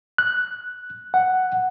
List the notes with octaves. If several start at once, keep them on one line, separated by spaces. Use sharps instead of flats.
F#6
F#5